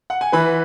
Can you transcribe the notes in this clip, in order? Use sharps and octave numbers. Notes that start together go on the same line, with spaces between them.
F#5
G#5
E3 B4 B5